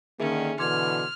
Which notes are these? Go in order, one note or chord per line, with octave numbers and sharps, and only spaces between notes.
D3 D#3 A#3 C#4 G#4 E5
B2 D3 E3 C6 D6 F6 G#6